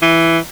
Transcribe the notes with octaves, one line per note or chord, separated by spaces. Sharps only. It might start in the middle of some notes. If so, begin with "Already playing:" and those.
E3